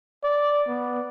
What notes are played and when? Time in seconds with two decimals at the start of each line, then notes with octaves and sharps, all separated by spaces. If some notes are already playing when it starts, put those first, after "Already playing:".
0.24 D5
0.68 B3